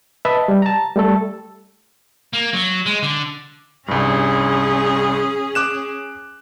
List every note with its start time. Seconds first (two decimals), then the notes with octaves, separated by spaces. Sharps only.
0.25 B4 D#5 E5 A5
0.48 G3
0.62 A5 A#5
0.96 G3 A3 A4
2.33 A#3
2.54 F#3
2.86 G#3
3.02 D3
3.88 C2 G2 C#4 G#4
5.55 D6 F#6 E7